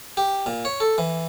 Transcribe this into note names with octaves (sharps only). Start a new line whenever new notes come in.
G4
A#2
C#5
A4
E3